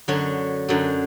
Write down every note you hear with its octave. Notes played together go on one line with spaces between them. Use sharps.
F#2 D3 F#3 C#5
F#2 D3 F#3